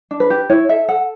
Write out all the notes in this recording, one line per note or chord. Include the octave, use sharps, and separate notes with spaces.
D4
B4
G4
E4 C#5
A4 E5
A4 F#5